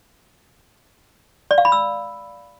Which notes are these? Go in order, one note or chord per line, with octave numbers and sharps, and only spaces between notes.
D5
F5
B5
E6